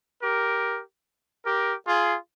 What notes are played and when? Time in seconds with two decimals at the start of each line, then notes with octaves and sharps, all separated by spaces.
0.22 G4 A#4
1.45 G4 A#4
1.86 F4 G#4